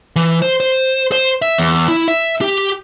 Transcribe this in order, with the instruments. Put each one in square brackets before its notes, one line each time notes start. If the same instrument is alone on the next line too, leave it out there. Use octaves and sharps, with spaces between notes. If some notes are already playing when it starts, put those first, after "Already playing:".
[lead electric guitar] E3
C5
C5
C5
E5
E2
E4
E5
G4